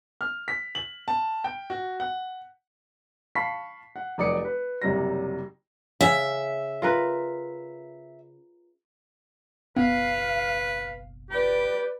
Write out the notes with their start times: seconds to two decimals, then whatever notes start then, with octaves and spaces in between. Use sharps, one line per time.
0.21 F6
0.48 B6
0.75 F#7
1.08 A5
1.44 G5
1.70 F#4
2.00 F#5
3.35 F5 A5 B5 C#6 B6 C7
3.96 F#5
4.18 F1 F#3 D5 D6 D#6 C#7
4.45 B4
4.82 F#1 C3 F#3 G3 A#6
6.01 C#3 E5
6.82 F4 A#4 B4
9.76 F#1 B1 B3 B4 F5
11.30 G4 B4 D5